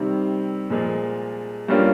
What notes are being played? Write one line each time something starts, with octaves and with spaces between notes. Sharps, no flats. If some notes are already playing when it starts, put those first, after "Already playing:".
Already playing: C3 D#3 G3 C4
A#2 F3 G#3
G2 G3 A#3 C#4 F4